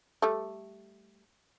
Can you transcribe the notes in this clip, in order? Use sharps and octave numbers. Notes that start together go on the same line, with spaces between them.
G3 A3